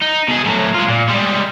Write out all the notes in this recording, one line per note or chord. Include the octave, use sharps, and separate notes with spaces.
D#4
B2 G#4
A2 F#3
G#3 F4
A#2
G3 G#3